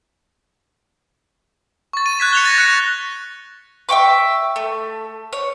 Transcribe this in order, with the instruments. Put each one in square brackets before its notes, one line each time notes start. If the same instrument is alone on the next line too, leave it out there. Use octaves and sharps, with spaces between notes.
[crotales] C#6 A6
D#7
F#6 G#6 B6 E7
C#7 F7 G7
A6 A#6
F#6 C#7
[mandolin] E5 G5 C#6 D6
A3
C#5